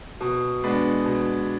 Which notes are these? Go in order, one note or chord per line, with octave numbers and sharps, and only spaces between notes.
B2
G#3 B3 D4
B2